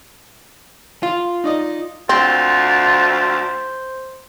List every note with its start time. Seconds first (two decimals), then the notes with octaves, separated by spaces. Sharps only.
1.03 F4
1.44 D#4 D5 D#5
2.09 D2 C4 F4 C5